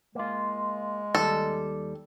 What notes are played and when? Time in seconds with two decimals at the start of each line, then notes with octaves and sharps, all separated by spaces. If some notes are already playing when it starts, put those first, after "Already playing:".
0.15 G#3 A#3 F4
1.15 D#2 G3 A4